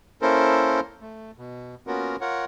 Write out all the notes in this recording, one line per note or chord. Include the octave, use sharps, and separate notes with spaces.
A#3 C#4 E4 A4 A#4 C5
A3
B2
A#3 B3 C#4 F4 F#4 A#4
F4 A#4 C#5 F#5